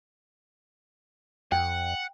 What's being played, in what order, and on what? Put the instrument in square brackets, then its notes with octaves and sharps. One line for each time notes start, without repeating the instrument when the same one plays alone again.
[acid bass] F2 [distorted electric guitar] F#5 [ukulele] G5